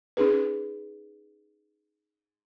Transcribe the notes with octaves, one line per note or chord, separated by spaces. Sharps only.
C#4 D#4 G#4 B4